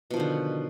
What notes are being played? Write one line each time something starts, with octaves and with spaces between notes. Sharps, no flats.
B2 D3 D#3 F3